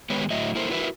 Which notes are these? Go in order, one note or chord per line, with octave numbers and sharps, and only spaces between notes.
D#3 G#3 B3 G4 B4 C#5
A2 D3 F#3 D#5 E5
A#3 E4 A4 A#4 C5
E4 F#4 A#4 B4 D5 E5